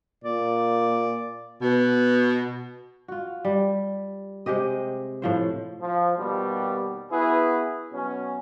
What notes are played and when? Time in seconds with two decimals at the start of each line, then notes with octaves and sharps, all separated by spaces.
0.24 A#2 D5
1.62 B2
3.08 F4 F#4
3.45 G3
4.46 C3 G#3 G4 D#5
5.22 A2 F3 C5
5.81 F3
6.16 D#2 B2 G3
7.11 B3 E4 F#4 G#4 B4
7.93 B2 F#3 C#4